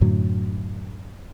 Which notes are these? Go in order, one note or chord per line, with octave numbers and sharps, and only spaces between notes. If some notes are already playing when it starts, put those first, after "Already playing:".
F#2 A2 D3 F#3